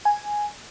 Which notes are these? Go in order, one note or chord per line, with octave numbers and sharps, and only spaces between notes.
G#5